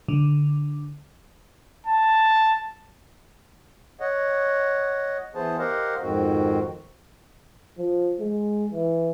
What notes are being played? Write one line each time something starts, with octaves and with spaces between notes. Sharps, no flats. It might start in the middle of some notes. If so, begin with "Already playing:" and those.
D3
A5
C#5 D#5 F#5
E3 B3 G#4 C5 A5
G4 A#4 C5 D#5 F5 F#5
F2 G#2 D#3 C4 F#4
F3
G#3
E3